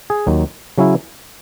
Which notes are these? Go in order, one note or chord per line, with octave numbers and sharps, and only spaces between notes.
G#4
D#2 D#3 F#3
C#3 F#3 C#4 E4